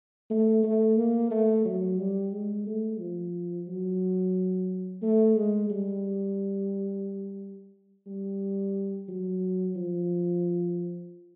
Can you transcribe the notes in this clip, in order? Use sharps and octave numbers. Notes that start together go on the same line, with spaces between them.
A3
A3
A#3
A3
F#3
G3
G#3
A3
F3
F#3
A3
G#3
G3
G3
F#3
F3